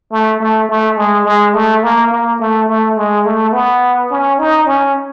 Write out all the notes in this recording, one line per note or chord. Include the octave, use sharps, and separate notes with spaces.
A3
A3
A3
G#3
G#3
A3
A#3
A#3
A3
A3
G#3
A3
B3
C#4
D#4
C#4